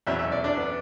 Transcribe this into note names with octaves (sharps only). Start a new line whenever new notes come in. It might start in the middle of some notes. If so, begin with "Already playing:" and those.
E2 B2 F#3 E5
E5
D5
D4
B3